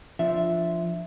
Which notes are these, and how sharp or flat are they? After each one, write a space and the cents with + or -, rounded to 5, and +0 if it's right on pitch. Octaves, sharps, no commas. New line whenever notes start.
F3 -15 D4 +0 E5 +0